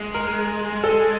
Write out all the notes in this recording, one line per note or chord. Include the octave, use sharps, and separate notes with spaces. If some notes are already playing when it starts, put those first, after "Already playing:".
Already playing: G#3
A#4
A4